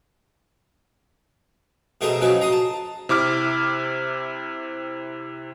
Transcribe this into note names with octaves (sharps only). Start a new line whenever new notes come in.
B2 A3 G#4 C5 D#5 A#5
C#3 F3 F#3 D#4 B4
A#5 C6 D#6
A5
C3 E4 D6 F6